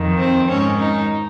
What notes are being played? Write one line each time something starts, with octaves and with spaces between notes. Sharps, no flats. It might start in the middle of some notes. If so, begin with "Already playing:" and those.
Already playing: F2 D#3
C4
G#2 D#3 C#4
D#4